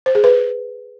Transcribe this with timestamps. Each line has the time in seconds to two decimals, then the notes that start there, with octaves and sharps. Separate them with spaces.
0.06 C5
0.15 G#4
0.24 B4